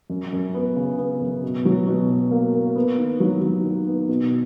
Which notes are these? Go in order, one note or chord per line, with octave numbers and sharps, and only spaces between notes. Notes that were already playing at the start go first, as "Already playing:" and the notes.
F#2
F#2
B3
C#3
B3
F#2
B2
F#3
B2
B2
A#3
A#3
B3
D#3
F#3
F#3
D#3
B3
B2